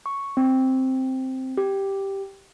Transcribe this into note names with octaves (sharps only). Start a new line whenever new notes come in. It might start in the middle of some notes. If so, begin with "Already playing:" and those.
C#6
C4
G4